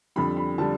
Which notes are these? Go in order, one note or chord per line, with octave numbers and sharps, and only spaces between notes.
F2 D3 G3 B5
B5
D3 G3 A5